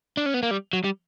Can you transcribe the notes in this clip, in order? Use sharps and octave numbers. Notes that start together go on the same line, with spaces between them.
D4
C#4
B3
A#3
G3
F#3
G3